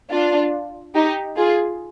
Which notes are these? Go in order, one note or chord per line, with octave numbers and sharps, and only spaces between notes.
D4 F4
D#4 G4
F4 G#4